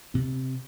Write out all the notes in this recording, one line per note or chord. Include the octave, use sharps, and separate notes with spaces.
C3 C4